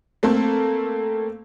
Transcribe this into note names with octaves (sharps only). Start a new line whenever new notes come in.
A3 A#3 C4 A4